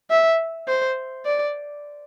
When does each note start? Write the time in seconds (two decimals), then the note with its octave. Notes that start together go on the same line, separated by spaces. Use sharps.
0.10 E5
0.68 C5
1.25 D5